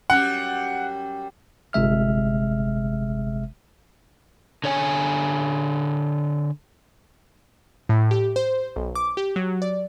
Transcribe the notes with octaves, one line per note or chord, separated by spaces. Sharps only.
F#2 G3 F#5
G1 C3 G#3 E5 F6
D3 C#5 G#5
A2
G4
C5
B1
D6
G4
F#3
D5